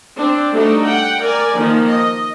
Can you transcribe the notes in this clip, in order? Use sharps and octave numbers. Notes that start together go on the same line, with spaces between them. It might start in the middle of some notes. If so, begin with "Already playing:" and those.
C4 D4
G3 A3 D4 D#4 F#4
F#5 G5
A#4 D5 G#5
D#3 F3 A#3 D#4
D#5